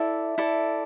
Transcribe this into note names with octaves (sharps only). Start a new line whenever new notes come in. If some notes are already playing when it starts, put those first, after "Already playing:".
Already playing: E4 A4 D5 E5
E4 A4 D5